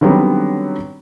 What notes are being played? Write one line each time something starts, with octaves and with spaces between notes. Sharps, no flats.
D3 D#3 F#3 G3 B3 C4